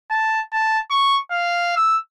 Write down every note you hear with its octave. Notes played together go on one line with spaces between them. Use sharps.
A5
A5
C#6
F5
E6